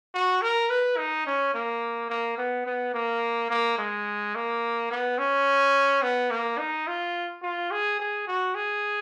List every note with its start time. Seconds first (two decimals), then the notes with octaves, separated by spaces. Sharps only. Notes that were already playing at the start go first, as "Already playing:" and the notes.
0.14 F#4
0.42 A#4
0.70 B4
0.98 D#4
1.27 C#4
1.54 A#3
2.10 A#3
2.38 B3
2.66 B3
2.94 A#3
3.50 A#3
3.78 G#3
4.35 A#3
4.91 B3
5.18 C#4
6.02 B3
6.31 A#3
6.59 D#4
6.87 F4
7.43 F4
7.71 G#4
7.99 G#4
8.27 F#4
8.55 G#4